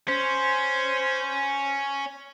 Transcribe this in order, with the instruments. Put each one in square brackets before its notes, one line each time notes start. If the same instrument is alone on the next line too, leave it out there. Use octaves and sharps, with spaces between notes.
[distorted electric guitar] C#4 [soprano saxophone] C5